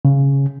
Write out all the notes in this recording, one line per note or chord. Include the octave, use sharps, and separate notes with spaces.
C#3